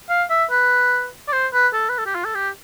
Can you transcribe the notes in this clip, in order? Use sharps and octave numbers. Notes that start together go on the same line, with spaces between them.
F5
E5
B4
D5
C5
B4
A4
B4
A4
G4
F4
A4
G4